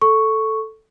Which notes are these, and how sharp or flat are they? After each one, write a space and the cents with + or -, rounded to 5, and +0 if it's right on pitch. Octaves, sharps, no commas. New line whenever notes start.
A4 +0 C#6 +0